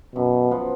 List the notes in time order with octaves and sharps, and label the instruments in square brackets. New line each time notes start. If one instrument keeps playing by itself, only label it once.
[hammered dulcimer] F#2 [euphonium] B2
[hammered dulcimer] F3 B3 F4